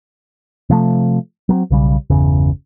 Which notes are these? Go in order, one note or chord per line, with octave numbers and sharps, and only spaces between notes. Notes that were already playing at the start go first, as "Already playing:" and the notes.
C3 F3 A3
F#3 A#3 C4
B1 C#3 G3
G1 E2 C#3